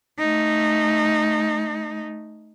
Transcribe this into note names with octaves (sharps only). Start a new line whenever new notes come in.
A3 D#4